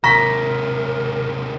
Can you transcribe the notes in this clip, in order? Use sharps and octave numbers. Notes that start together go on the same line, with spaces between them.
D#2 C3 A#4 A#5 C#6 A#6 B6